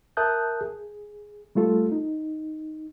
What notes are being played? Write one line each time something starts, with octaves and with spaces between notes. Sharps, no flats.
A#4 E5 A5 D#6 F#6 G6
G#4
G3 A3 F4 A4
D#4